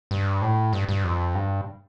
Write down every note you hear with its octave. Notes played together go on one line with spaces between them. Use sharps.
G2
A2
G2
G2
F2
G2